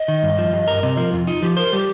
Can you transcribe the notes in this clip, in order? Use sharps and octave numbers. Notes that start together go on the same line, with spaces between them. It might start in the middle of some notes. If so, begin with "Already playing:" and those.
Already playing: D#5
D#3
G2
F3
G2
A#4
C3 D#5
F3 A#4
F2 F4
D#4 F4
F3 G4
A#4 C5
G3 G4